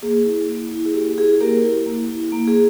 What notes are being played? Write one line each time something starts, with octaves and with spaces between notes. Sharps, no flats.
A#3 G#4
E4
A#3
E4
G#4
A#3 G4
E4 G#4
A#3 G4 A#4
E4
A#3
E4
A#3
G#4